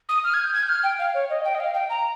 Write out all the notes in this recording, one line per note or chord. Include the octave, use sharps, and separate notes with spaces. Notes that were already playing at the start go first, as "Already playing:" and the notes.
D#6
F6
G#6
G6
G#6
G6
F6
G5
F5
C#5
D#5
G5
D#5
F5
G5
A#5